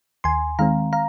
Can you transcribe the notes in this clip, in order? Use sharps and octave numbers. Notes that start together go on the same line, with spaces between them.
D#2 G#5 C6
D#3 G#3 C4 F5 A#5
F5 A#5